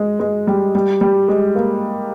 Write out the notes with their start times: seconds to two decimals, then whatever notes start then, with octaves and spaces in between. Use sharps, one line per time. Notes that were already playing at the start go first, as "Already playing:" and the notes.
Already playing: G#3
0.20 G#3
0.47 G3
0.75 G3
1.01 G3
1.28 G#3
1.55 A#3